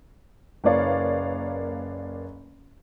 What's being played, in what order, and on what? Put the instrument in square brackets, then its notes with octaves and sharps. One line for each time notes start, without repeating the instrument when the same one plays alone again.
[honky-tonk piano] F#1 A#3 B4 C#5 D5 F5